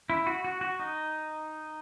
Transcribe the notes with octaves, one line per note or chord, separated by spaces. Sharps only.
E4
F#4
F#4
F#4
D#4